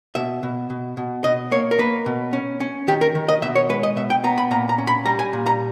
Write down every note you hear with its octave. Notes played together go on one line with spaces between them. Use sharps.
B2 E5
B2
B2
B2
B2 D#5
A#3 C#5
A#4
A#3 B4
B2
C#4
C#4
D#3 G4
A#4
D#3
D#5
B2 E5
C#5
G#3 B4
D#5
B2 E5
G5
B3 A#5
B5
A#2 A#5
A#5
C#4
B5
G3 A#5
G#5
A#2
A#5